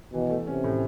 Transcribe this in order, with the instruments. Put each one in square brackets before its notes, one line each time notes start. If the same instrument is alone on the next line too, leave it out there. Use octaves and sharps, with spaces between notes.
[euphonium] B2 [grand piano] E3
[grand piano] A3
[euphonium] C3 [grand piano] C#4
[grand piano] A2